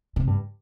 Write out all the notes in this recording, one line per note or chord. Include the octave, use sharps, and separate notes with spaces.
C3
G2